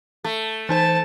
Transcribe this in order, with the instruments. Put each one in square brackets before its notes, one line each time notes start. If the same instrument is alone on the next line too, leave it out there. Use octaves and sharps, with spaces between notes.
[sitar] A3
[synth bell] E3 D#4 C5 [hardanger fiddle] A5